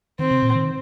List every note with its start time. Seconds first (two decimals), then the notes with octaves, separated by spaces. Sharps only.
0.19 D#3 C4
0.31 C3
0.43 A#2
0.55 D#3